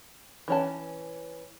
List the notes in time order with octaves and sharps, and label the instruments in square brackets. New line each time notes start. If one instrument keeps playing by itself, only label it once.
[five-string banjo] E3 C#4 A5